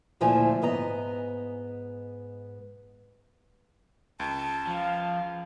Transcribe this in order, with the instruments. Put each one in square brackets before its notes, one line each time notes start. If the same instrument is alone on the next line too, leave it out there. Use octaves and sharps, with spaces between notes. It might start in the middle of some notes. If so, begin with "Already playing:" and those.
[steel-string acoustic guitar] D2 A#2 F3 A3 E4 G#5
G#2 B3 D#5 A#5
[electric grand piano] C#2 [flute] A5
[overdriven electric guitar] F3 [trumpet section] F5